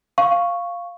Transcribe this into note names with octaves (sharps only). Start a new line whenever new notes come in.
F5 C#6